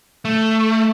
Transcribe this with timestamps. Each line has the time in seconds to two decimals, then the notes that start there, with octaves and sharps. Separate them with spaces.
0.25 A3